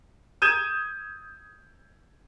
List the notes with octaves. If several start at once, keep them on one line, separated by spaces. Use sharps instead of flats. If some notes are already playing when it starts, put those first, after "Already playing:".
D#6 G6 G#6 E7